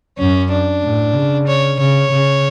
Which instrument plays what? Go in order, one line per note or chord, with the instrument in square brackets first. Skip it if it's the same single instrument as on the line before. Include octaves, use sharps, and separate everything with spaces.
[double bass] F#2 [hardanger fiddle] C#4
[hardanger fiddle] D4
[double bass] A2
C#3
[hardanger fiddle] C#5
[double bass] C#3 [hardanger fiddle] C#5
[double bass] C#3